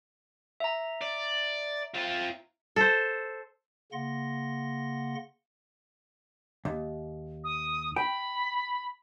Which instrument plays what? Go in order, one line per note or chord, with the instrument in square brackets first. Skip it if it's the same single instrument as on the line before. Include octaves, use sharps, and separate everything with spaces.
[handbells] E5 A#5
[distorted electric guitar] D5
C4 F4
[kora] A4 C5
[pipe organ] C#3 A#3 F#5 C6 A#6
[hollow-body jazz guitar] D#2
[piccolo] D#6
[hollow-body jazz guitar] G5 [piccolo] B5